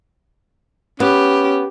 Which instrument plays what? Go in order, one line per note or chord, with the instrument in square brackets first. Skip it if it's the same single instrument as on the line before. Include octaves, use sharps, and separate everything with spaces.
[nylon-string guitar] B3 [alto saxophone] C#4 [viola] G4